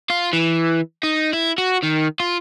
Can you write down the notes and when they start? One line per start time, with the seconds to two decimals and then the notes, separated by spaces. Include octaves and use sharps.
0.10 F4
0.33 E3
1.03 D#4
1.33 E4
1.58 F#4
1.83 D#3
2.20 F4